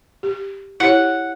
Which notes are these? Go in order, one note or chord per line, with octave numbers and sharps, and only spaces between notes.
G4
E4 G4 C#5 F#5